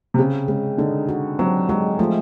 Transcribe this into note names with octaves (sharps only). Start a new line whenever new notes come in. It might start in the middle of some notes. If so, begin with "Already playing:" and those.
C3
C#3 C4
C#3 G#3
D3 D#4
F#4
F#3 C4
F#3 G#3
F3 A3